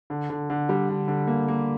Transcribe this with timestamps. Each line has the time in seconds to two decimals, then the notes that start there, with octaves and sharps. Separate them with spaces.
0.10 D3
0.30 D3
0.50 D3
0.69 G3
0.89 D3
1.08 D3
1.27 A#3
1.48 A#3